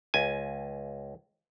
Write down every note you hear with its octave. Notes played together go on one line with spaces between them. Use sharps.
C#2 G#5